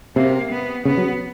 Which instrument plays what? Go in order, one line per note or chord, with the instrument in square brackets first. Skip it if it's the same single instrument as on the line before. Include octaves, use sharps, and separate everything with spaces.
[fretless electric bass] C3 [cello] A#3
[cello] B3
[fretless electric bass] C#3 [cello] B3
[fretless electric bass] F#3